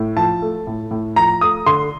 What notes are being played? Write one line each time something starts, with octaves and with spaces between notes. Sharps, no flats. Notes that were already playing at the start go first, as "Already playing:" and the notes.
Already playing: A2
F3 A5
A3
A2
A2
F3 A#5
A3 D#6
D3 C6